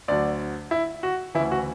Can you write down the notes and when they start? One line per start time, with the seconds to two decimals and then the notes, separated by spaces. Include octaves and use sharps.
0.08 D2 D3 F#3 D5
0.71 E4
1.03 F#4
1.35 D2 C#3 E3 E4
1.51 F#4